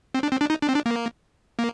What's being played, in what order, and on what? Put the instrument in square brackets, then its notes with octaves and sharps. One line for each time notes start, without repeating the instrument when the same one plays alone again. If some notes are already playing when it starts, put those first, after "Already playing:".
[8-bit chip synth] C4
D4
C4
D4
D#4
D4
C4
D4
A#3
A#3